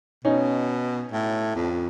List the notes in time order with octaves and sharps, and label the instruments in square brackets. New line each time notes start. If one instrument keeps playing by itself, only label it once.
[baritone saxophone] B2 [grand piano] C#4 D#4
[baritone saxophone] A2
F2